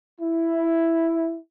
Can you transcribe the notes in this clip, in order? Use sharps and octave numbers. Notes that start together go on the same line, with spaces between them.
E4